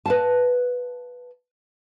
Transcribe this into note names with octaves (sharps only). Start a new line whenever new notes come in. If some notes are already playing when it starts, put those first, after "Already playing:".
B4 F5 A5